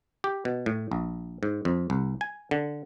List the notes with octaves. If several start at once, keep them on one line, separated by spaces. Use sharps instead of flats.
G4
B2
A2
A#1
G#2
F2
C2
G#5
D3